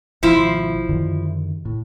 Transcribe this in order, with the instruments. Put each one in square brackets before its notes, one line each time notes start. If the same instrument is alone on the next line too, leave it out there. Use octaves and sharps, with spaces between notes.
[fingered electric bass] G#1 B2 [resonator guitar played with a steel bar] F3 E4
[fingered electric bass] F#2 D3 D#3
A2